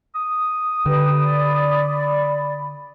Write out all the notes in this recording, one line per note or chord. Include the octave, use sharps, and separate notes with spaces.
D#6
D3 G4 B4 G5
D5 B5